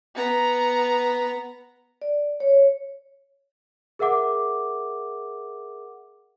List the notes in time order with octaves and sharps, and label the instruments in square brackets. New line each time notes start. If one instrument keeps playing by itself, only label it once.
[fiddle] B3 A#5
[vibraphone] D5
C#5
[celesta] G#4 A#4 E5 F#5 D6